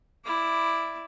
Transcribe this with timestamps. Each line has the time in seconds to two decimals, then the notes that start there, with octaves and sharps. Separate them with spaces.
0.25 E4 D5